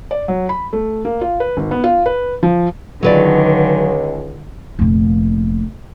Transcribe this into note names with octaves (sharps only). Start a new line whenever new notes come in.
D5
F#3
B5
A3
A#3
F4
B4
G#1
B3
F4
B4
F3
C#2 D3 D#3 F#3 B4 D5
F1 A#2